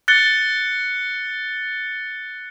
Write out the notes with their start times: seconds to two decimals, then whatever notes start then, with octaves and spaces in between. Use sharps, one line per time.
0.08 F#6 A6 C#7 G7